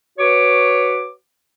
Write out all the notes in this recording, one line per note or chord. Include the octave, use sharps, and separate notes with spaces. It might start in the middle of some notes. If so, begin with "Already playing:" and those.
F#4 B4 C#5 D6